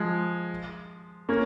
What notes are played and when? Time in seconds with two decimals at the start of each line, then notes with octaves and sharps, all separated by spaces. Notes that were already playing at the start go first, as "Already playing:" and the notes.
Already playing: F3 G#3
1.29 A#3 C#4